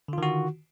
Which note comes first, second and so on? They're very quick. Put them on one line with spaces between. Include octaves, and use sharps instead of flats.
D3 F4 D#3 F#4